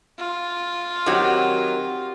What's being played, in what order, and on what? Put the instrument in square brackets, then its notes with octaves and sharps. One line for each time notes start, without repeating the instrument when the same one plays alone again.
[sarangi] F4
[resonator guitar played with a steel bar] D#3 F#3 [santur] C4 F#4 G4